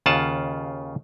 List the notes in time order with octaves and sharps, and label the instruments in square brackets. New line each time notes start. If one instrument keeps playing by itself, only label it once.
[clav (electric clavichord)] D#2 C#3 F4 F#5 A5